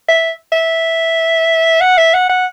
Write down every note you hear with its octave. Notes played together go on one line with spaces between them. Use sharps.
E5
E5
F#5
E5
F#5
F#5